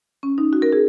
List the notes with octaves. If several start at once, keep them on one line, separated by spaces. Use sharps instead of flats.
C#4
D#4
F#4
A#4
G#4